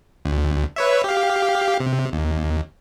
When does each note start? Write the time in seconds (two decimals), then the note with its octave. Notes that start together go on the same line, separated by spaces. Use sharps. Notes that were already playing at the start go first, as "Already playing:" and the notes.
0.25 D2
0.76 B4 C#5 E5
1.04 G4 F5
1.80 C3
2.12 D#2